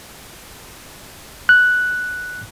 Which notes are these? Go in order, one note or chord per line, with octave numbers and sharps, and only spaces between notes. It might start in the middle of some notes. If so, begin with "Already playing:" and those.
F#6